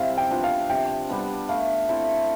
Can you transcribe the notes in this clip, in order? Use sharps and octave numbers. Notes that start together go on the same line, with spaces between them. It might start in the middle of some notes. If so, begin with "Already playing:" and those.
Already playing: C3 G3 C4 E4 E5 F5
G5
F3 B3 D4
F5
C3 G5
G3 B3 D4
A3 F5
C4 E4 A4